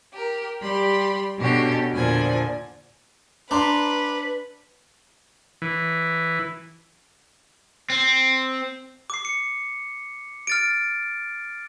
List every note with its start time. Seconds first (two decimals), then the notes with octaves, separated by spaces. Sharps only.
0.14 G4 A#4
0.61 G3 G4 B5 C6
1.38 B2 C#4 D4 G4 A4
1.93 E2 A#2 D3 F3 D4 G#5
3.51 D4 B4 A#5 C6 D6
5.62 E3
7.90 C4
9.10 D6 C7
9.25 C#7
10.47 F6 A6 D7